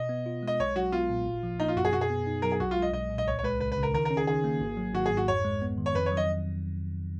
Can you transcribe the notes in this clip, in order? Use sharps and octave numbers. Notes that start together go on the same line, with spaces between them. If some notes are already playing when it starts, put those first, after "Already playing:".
Already playing: B2 D#5
B3
F4
G#3 D#5
B1 C#5
F#3 F#4
B3 F4
A#2
G#1
F3
A#3 D#4
F4
F#2 F#4
G#4
B2 F#4
G#4
B3
D#4
F#3 A#4
G#4
B1 F#4
F4
G#3
D#5
B1 D#5
A#2
D#5
C#2 C#5
C#5
G#3 B4
C#2 B4
B4
C#3
A#4
D#3 A#4
A#4
C#4
G#4
D#3 G#4
A#3
G#1
F#3
G#1 F#4
G#4
G#2
F#4
F2 C#5
G#3
B3
D#3
C#5
F2 B4
C#5
F#3
D#5